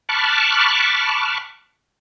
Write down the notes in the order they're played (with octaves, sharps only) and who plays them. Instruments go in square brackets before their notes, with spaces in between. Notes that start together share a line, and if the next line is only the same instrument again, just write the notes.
[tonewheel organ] A5 B5 C#6 D6 F6 F#6